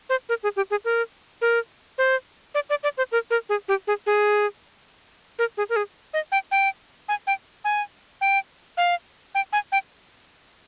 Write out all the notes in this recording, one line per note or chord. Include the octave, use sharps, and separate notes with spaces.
C5
A#4
G#4
G4
G#4
A#4
A#4
C5
D5
D5
D5
C5
A#4
A#4
G#4
G4
G#4
G#4
A#4
G#4
A#4
G#4
D#5
G5
G5
G#5
G5
G#5
G5
F5
G5
G#5
G5